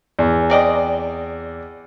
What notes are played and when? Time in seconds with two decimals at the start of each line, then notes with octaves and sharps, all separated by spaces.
0.19 E2
0.50 C4 D5 D#5